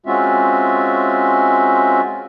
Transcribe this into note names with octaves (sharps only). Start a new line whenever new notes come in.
G#3 C4 C#4 F4 F#4 E5